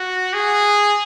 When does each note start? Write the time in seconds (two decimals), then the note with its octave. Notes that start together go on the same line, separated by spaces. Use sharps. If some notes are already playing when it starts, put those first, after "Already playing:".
Already playing: F#4
0.33 G#4